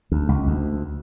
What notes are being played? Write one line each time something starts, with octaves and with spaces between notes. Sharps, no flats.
D2
C#2
D2